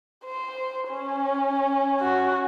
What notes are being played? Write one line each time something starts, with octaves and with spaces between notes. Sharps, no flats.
C5
C#4
F#4